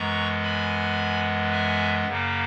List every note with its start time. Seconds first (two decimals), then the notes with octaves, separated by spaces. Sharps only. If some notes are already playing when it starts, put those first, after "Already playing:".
Already playing: F#2 E3 G#3 B3 A#5 C#6
0.44 G#5 B5
1.52 E5 G#5
2.07 F#2 C#3 F#3 A#3